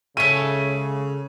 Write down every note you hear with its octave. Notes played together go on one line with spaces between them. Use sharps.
C#2 C#3 A4 C#5 E5 G#5 D#7